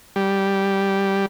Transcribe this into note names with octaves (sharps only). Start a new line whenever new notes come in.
G3